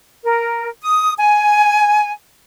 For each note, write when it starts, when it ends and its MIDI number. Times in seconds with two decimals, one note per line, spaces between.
0.23 0.67 70
0.81 1.13 87
1.18 2.10 80